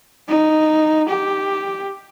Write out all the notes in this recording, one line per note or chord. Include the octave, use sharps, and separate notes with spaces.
D#4
G4